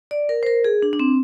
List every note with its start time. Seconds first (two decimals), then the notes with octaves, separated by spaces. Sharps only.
0.11 D5
0.29 A#4
0.43 C5
0.46 A#4
0.64 G#4
0.82 D4
0.93 D4
0.99 C4